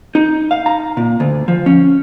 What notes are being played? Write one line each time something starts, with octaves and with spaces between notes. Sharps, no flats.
D#4
F5
A#5
A#2
D2
F3
C#4